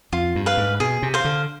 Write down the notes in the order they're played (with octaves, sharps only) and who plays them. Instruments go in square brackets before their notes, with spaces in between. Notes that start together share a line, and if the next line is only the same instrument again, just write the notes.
[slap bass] F2 [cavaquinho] F4
[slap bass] G2
[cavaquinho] B4 F5
[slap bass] G#2
[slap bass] B2 [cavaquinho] G#4
[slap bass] C3
[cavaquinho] C5 F5
[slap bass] D3